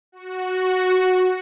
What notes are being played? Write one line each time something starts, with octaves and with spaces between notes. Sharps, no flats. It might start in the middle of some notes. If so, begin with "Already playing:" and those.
F#4